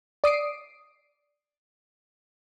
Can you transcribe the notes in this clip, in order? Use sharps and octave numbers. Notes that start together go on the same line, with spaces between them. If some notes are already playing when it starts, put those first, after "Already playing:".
D5 D#6 C7 D7